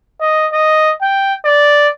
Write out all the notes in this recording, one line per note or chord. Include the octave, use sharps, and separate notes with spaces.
D#5
D#5
G5
D5